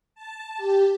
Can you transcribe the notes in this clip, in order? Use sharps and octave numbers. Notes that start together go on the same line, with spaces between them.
A5
G4